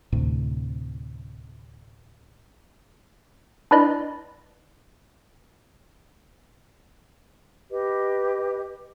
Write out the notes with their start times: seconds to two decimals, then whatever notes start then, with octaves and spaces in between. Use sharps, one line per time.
0.12 D2 A2 C3
3.71 D4 E4 B4 D5 D#5 B5
7.70 G4 B4 D#5